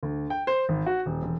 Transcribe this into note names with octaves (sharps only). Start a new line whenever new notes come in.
D2
G5
C5
G#1
F#4
D#1
E1